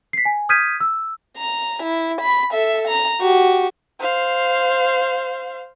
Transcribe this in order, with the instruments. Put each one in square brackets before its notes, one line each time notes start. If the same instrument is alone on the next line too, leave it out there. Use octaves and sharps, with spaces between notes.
[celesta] B6 C7
G#5
D#6 F6 G6 G#6 B6 D#7
E6
[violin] A#5
E4
B5
A4 E5
A#5
F#4 G4
[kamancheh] C5 F5